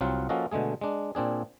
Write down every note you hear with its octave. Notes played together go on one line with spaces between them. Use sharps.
C2 F#3 C4 F4 F#5
F3 A#3 C#4 F#4 A4 D#5
B2 D3 G#3 A3 G#4
G#3 D4
A#2 C4 D4 G#4